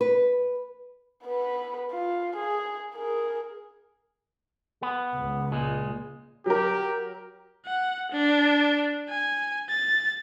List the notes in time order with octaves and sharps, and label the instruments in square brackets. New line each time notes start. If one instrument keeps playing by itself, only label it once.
[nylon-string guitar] B4
[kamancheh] B3 B4
F4
G#4
G#4 A#4
[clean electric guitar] B3
[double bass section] C#2
[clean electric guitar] A#2 G#3
[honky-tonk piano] F#3 A#4 [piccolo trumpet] G4
[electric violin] F#5
D4
G#5
A6